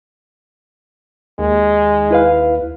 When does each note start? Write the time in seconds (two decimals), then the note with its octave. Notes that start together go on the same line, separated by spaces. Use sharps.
1.39 D#2 G#3
2.11 E4 B4 F5